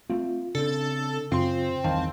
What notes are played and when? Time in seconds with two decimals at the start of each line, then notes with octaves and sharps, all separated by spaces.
0.10 A3 C4 F4
0.55 C#3 C4 D4 A4
1.32 F#2 C#3 C4 F4 C6
1.84 A1 E2 G2 D#3 F5 A5